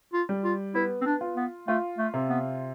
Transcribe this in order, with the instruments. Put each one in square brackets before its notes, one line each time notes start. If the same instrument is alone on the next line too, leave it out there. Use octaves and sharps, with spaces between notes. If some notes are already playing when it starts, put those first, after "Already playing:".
[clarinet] F4
[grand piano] G3
[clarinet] F4
[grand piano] B3 [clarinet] E4
[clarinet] C4
D4
[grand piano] F4
[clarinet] B3
[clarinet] A3 [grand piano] F4
[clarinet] A3
[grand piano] C3
[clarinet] B3